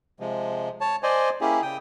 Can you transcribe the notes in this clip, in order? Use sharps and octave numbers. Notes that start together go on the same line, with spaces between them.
C3 F3 G#3
C#5 A5
C5 D5 D#5 G#5
A#3 C#4 E4 G4 G#4
C#3 G5 D#6